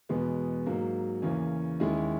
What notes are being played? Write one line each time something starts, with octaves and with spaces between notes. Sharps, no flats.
E2 B2 G#3 B3
G#2 F#3 A#3
E2 C#3 E3 A#3 C#4
D#2 D#3 G#3 C#4 E4